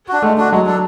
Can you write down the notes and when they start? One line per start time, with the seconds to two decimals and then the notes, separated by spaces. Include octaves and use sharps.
0.08 D4 F#4
0.22 G#3 A3
0.38 D4 F#4
0.51 F#3 G#3
0.66 D4 A4